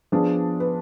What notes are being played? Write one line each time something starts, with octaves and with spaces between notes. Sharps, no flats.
F3 B3 D4 G#4
B4